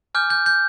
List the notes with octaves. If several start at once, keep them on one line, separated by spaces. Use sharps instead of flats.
G#5 D6 F6 G6
G6
G6